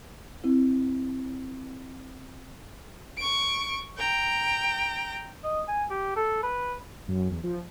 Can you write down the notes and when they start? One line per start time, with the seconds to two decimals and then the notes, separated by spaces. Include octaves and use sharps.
0.44 C4 E4
3.17 C#6 D7
3.97 G5 A#5
5.44 D#5
5.68 G#5
5.90 G4
6.16 A4
6.43 B4
7.08 F#2
7.30 E2
7.43 F3